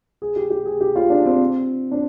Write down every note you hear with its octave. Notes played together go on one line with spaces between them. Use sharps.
G#4
G4
G4
G#4
G4
F4
D4
C4
D4